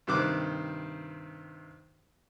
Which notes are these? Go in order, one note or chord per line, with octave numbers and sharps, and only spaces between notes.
G2 C3 D#3 C5 D6 F#6